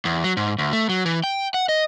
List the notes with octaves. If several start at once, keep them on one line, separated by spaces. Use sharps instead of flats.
E2
F#3
G#2
D2
A3
F#3
E3
G5
F#5
D#5